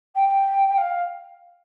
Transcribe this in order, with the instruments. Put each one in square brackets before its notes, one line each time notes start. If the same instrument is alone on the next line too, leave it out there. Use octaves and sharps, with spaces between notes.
[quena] G5
F5